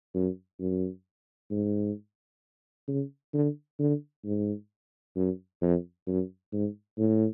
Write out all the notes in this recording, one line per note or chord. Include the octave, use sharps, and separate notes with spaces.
F#2
F#2
G#2
C#3
D3
D3
G#2
F#2
F2
F#2
G#2
A2